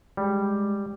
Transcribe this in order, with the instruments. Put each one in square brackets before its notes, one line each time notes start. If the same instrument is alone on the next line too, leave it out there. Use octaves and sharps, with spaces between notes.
[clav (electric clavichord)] G3 [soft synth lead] G#3